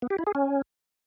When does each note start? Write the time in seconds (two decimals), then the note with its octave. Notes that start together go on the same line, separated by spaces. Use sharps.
0.02 B3
0.10 G4
0.19 E4
0.27 G#4
0.35 C#4